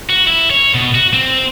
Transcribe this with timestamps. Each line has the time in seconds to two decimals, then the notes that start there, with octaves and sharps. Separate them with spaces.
0.10 F#4
0.27 E4
0.51 C#5
0.74 B2
0.95 F#4
1.13 C4